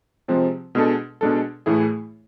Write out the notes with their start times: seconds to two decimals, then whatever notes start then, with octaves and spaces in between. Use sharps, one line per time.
0.28 C3 F3 G#3 C4
0.75 B2 G#3 D4 A4
1.21 B2 G#3 D4 A4
1.66 A2 E3 A3 E4 G#4